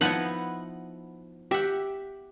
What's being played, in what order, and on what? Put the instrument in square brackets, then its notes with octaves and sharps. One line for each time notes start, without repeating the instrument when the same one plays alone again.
[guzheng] F3 B3 E4 [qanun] D#4 B4 F#5
[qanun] G4 [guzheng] E5 F#5